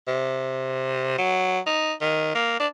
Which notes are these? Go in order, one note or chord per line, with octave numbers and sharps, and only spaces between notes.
C3
F#3
D#4
D#3
A#3
D4